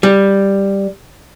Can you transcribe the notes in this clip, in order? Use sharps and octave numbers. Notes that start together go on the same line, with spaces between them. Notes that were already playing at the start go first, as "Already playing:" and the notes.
G3